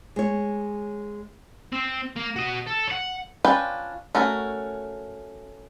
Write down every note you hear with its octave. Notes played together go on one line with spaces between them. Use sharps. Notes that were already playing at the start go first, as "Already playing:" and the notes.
G#3 C#5
C4
A#3
F#4 D#5
A4
C#5 F#5
C#4 D4 F4 B4 G5
A3 C#4 F#4 A#4